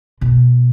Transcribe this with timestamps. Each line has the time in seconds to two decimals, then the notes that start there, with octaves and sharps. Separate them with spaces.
0.21 B2